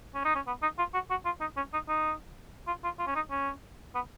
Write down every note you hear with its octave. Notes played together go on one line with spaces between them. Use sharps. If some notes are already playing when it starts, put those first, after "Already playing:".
C#4
D#4
C#4
B3
D#4
F4
F#4
F#4
F4
D#4
C#4
D#4
D#4
F4
F4
F4
C#4
D#4
C#4
B3